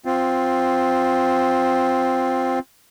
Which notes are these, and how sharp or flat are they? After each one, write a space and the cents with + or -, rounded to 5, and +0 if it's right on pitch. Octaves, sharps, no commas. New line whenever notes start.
C4 +0 F4 +10